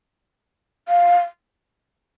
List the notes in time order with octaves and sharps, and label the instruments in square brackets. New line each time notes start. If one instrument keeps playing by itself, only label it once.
[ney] F5